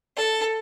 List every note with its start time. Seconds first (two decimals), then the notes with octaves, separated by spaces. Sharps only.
0.16 A4